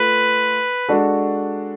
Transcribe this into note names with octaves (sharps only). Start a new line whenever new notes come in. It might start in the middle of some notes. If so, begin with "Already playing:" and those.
Already playing: A3 F4 B4
G#3 D4 F#4 A4